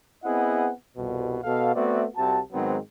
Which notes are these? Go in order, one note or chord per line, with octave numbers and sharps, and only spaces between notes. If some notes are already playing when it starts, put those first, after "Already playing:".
B3 C4 E4 G#4 D#5 F#5
C2 F2 B2
B2 A4 F5
A3 B3 C4 F#4 D5 E5
C2 C3 F#4 A5
G#2 D#3 F#3 G#3 B3 C4